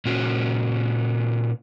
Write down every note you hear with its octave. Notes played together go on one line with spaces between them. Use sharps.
A#2 C#4 F#4